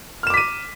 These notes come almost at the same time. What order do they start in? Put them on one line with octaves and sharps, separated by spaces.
F6 E7 D6 B6 D#7